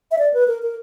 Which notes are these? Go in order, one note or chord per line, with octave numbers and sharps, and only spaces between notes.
E5
D5
B4
A#4
A#4